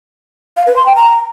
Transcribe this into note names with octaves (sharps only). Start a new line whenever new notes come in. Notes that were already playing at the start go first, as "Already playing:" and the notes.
F5
B4
C6
G5
A#5